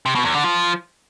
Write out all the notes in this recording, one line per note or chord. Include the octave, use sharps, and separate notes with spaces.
C3
B2
E2
D3
F3